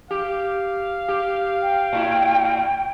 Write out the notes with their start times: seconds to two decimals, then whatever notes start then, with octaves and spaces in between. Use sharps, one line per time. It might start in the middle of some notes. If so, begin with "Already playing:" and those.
0.11 G4 F5
1.08 G4
1.62 G5
1.93 A2 E4